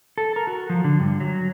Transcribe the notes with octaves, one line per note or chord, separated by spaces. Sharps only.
A4
A#4
F#4
F3
D3
G2
F#3